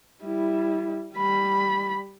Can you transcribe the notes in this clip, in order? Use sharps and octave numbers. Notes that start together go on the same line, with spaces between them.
G3 E4
G3 B5